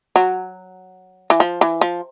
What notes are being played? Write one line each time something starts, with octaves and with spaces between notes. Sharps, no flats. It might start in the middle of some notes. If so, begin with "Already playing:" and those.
F#3
E3
F3
E3
F3